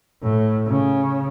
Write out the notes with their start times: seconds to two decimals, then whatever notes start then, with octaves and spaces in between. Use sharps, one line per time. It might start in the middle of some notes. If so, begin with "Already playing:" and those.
0.23 A2
0.66 C#3